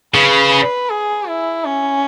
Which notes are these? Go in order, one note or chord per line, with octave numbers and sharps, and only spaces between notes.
C#3 B4
G#4
E4
C#4